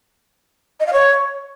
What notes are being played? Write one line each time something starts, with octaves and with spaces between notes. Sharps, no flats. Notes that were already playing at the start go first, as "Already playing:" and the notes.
D#5
F5
C#5